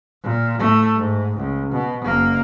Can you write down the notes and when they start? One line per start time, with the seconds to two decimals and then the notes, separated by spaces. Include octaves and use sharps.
0.24 A#2
0.59 A2 A3
0.95 G#2
1.37 C#2
1.72 B2
2.04 F#1 A#3